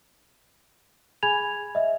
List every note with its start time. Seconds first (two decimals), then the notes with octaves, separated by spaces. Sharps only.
1.23 G#4 G#5 B5 G#6 F7
1.75 D#5 E5